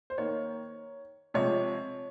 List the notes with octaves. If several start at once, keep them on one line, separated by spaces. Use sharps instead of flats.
C5
D#3 A#3 C#5
C3 F3 G#3 C#5